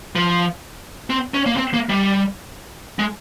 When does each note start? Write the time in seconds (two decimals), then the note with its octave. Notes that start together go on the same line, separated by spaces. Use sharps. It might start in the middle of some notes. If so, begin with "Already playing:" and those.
0.16 F3
1.10 C4
1.34 C#4
1.46 A#3
1.57 C4
1.74 A#3
1.89 G3
2.99 G#3